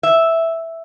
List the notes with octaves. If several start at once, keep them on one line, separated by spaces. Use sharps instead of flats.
E5